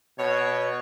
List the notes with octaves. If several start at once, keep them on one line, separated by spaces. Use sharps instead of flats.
B2 C#5